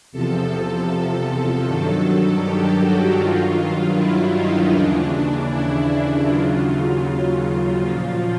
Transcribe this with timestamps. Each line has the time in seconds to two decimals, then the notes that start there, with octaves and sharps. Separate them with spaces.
0.12 E2 C3 F3 A4
1.65 G2 D#3 F#3 A4
2.41 G4
2.79 F#4
3.18 G2 D#3 F#3 F4
3.94 E4
4.33 D#4
4.71 D#2 C#3 E3 D4
5.48 E4
6.24 D#2 C#3 F#3 F4
7.78 A#2 F3